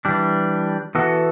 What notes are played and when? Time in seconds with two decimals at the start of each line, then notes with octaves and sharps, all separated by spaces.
0.05 E3 G3 D4
0.95 E3 B3 F#4 A4